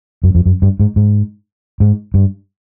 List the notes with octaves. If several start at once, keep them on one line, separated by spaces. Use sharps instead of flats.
F#2
F2
F#2
G2
G#2
G#2
G#2
G2